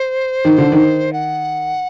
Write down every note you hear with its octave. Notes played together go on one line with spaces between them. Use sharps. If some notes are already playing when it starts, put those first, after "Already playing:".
Already playing: C5
D#3
D3
D#3
F#5